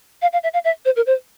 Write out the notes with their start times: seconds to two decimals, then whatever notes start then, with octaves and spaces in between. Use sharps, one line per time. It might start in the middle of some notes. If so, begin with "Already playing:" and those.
0.22 F5
0.33 F5
0.43 E5
0.53 F5
0.64 E5
0.85 C5
0.96 A#4
1.06 C5